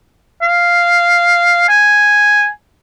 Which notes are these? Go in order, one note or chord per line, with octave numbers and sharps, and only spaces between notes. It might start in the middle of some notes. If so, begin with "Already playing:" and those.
F5
G#5